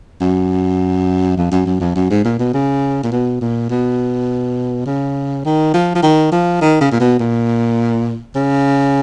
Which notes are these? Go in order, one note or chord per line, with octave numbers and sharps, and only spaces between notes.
F#2
F2
F#2
F#2
F2
F#2
G#2
A#2
B2
C#3
A#2
B2
A#2
B2
C#3
D#3
F3
F3
D#3
F3
D#3
C#3
A#2
B2
A#2
C#3